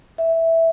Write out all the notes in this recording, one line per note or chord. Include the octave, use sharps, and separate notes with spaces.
E5